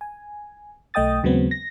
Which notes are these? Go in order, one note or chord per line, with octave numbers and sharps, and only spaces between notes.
G#5
B1 A3 D#5 G5 D#6 A6
D#2 C#3 F#3 G#3 B3 C4
A#6